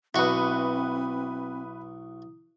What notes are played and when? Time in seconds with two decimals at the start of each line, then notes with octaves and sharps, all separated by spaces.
0.15 B1 C4 E4 F#4 B4 E5 D#6